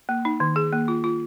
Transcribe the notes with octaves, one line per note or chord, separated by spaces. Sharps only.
A#3
D#4
D#3
G#4
A#3
F4
F4